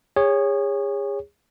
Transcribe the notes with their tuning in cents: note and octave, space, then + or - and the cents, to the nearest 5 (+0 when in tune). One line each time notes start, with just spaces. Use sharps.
G#4 -35 C#5 +0